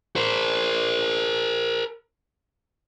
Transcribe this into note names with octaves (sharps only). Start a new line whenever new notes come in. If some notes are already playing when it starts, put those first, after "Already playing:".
A#4 C5